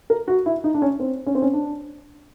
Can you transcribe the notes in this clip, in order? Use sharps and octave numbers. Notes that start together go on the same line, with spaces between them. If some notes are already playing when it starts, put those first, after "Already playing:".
A#4
F#4
E4
D#4
D4
C#4
C4
C#4
C4
C#4
D4